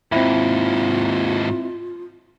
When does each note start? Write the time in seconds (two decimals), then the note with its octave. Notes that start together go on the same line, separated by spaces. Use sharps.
0.12 D#2 G#2 C4 E4 F4